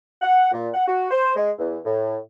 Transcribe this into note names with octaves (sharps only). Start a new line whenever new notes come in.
F#5
A#2
F#5
F#4
C5
G#3
E2
A2